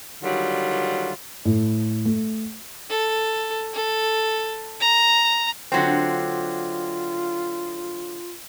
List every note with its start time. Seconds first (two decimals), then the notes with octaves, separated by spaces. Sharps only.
0.22 D3 D#3 F#3 G3 F4
1.45 A2
2.05 A3
2.90 A4
3.74 A4
4.81 A#5
5.72 D3 F#3 C4 F4